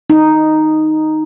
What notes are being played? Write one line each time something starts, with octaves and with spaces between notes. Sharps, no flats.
D#4